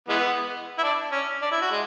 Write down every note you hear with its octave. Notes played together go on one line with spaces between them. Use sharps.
E3 G#3 B3
E4
D4
C#4
D4
E4
F#4
G#3